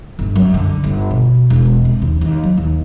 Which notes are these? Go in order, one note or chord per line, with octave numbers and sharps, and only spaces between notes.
G1
F#2
D3
G1
B2
E1
C3
D#2
D#2
F#3
D#2